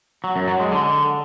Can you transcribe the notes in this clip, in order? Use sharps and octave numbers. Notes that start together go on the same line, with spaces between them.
F#3
F#2
F#3
G#3
D3